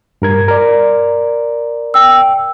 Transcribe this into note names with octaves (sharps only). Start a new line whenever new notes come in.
G2 A#4 G#6
A#4 D5
G5 E6